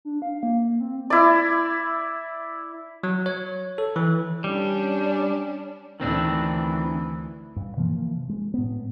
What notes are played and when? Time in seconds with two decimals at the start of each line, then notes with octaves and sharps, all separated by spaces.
0.05 D4
0.22 F5
0.43 A#3
0.80 C4
1.10 E4 D5
3.03 F#3
3.26 C#5
3.78 A4
3.96 E3
4.44 G3 C#4 D4
6.00 D2 D#3 E3 C4 D4
7.56 G2
7.77 C3 E3 F3 A#3
8.29 G#3
8.54 A2 B3